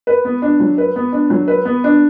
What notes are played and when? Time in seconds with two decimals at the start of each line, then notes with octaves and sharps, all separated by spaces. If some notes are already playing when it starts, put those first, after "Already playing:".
0.07 B4
0.25 B3
0.42 D4
0.60 F#3
0.78 B4
0.96 B3
1.12 D4
1.30 F#3
1.48 B4
1.65 B3
1.84 D4